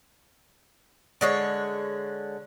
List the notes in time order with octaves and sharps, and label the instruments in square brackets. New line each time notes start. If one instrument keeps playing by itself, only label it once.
[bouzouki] D3 G#3 C#5